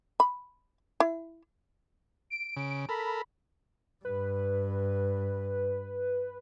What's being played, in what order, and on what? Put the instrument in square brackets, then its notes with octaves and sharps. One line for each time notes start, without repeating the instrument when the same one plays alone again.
[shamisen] B5
E4
[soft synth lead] D7
[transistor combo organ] C#3
[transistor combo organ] A4 A#4 [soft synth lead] B5
[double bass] G2 [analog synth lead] B4